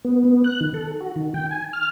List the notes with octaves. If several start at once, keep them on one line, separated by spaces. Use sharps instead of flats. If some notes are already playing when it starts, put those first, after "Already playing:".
B3
B3
F#6
D#3
A4
F#4
D#3
G5
G#5
F6